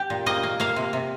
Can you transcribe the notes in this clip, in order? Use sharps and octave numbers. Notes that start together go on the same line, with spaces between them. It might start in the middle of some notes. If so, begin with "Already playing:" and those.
Already playing: G4
A#2
A#3 D#5
A#3
A#3 F5
C3
C3